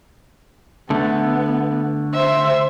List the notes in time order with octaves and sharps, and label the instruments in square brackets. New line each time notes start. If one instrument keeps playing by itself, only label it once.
[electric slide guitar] D3 A3 [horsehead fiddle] B3
[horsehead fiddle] C5 E5